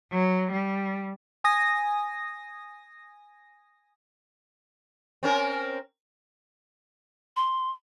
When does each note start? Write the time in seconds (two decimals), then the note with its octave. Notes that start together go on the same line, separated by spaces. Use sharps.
0.12 F#3
0.51 G3
1.44 G#5 D#6 A#6
5.23 C4 C#4 A#4
7.36 C6